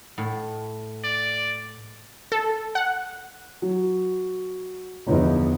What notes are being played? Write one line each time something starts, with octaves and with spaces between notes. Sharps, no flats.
A2
D5
A4
F#5
F#3
G1 E2 F3 D#4